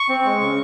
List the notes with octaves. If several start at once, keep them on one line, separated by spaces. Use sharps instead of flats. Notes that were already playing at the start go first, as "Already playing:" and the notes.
Already playing: C#6
C4
G#3
C#3